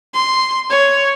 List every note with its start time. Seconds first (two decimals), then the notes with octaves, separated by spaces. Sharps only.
0.14 C6
0.70 C#5